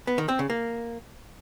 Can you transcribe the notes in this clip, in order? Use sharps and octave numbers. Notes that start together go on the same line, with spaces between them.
B3
D#3
C4
C#3
A#3